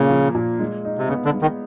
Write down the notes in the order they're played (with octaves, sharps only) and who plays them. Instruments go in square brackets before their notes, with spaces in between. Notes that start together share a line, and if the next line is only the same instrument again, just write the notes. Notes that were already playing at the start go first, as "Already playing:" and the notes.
Already playing: [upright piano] A#2 A#3 [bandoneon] C#3
[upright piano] F3
A#2
G#3
D#4
[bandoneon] C3
[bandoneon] C#3 [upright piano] B3
[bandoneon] D3
[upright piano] G#3
[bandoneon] D#3